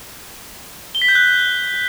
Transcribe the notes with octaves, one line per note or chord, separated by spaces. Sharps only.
G7
B6
G6
F#6